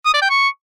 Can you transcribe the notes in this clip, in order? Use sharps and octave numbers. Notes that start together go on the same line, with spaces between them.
D#6
D5
G5
C#6